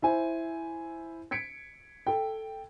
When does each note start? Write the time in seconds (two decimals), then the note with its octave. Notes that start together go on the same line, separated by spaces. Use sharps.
0.02 E4 C5 G#5
1.31 G#6 B6 C#7 D7
2.07 A4 G5